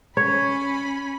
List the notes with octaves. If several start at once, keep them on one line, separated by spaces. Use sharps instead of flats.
C#4 C#5 B5